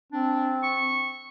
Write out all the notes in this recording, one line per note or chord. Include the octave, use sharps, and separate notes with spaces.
C4 D4
C#6